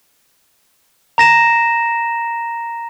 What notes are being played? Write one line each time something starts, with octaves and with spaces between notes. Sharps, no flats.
A#5 A#6 E7